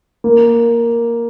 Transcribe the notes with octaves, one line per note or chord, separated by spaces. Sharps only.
A#3